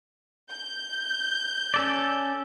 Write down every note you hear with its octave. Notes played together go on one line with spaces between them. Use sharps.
G6
C#4 A4 D5